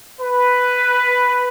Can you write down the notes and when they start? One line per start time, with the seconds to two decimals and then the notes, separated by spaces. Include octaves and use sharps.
0.20 B4